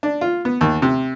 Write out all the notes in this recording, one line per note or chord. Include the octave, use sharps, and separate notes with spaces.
D4
F4
B3
D#2
C3